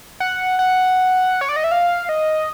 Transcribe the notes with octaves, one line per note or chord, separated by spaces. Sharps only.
F#5
F#5
C#5
D5
D#5
E5
F5
D#5